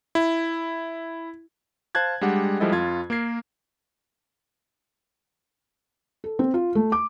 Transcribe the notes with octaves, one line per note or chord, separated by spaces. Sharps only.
E4
C5 F5 A5 F#6 G#6 A6
G3 G#3 D4 G4 F#5
F3 G3 G#3 E4 A4 D#5
F2 F4 G#6
A#3 A#4 G#6 C7
A4
C4
F4
A3
D6